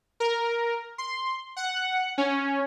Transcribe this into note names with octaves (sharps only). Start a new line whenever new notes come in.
A#4
C6
F#5
C#4